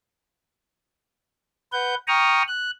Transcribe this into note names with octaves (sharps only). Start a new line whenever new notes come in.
B4 F#5 G6
G5 A#5 C#6 D#6 F6
F#6